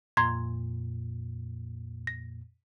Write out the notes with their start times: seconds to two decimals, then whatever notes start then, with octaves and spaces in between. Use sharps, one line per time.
0.17 F2 A#2 A#5 C6 G#6
2.07 A#6